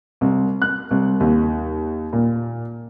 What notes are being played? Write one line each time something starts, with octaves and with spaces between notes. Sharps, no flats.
C2
F#6
C2
D#2
A#2